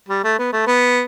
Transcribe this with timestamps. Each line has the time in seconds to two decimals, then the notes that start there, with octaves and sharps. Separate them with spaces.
0.09 G3
0.24 A3
0.39 B3
0.53 A3
0.67 B3